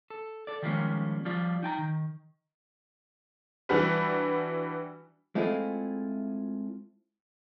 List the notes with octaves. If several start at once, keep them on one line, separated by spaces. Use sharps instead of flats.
A4
A4 D5
D#3 F3 G3 G#3 A#3 C#4
F3 G3 F4 D5
D#4 G5 A5 A#5
D#3
E3 G3 D4 F#4 B4
G#3 A3 C4 E4 F4 G#4